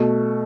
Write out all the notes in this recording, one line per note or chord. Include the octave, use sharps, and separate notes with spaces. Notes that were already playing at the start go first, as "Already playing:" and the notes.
Already playing: B2 A3